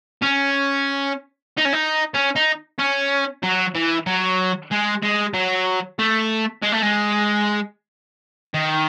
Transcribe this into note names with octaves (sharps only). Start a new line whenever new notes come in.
C#4
D#4
C#4
D#4
C#4
D#4
C#4
F#3
E3
F#3
G#3
G#3
F#3
A3
G#3
A3
G#3
D#3